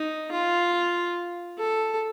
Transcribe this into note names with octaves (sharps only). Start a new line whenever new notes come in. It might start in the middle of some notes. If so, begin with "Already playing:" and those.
Already playing: D#4
F4
A4